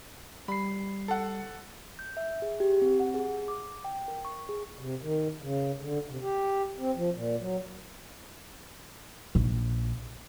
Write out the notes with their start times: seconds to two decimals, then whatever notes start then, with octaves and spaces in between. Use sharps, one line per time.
0.48 G3 B5 C7
1.08 A4 F#5
1.99 G6
2.17 E5
2.42 G#4
2.60 G4
2.82 C4
3.00 F#5
3.14 G#4
3.48 D6
3.85 G5
4.08 A#4
4.25 C#6
4.49 G#4
4.79 C3
5.02 D#3
5.42 C#3
5.80 D3
6.09 C3
6.22 G4
6.78 C4
6.96 F3
7.15 A#2
7.39 F#3
9.35 A#1